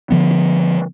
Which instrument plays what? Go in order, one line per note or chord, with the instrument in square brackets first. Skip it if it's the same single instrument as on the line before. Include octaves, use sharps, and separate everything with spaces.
[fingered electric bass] D3 F3 B3